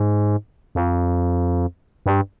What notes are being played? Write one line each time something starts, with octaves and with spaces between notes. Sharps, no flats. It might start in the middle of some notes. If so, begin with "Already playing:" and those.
Already playing: G#2
F2
G2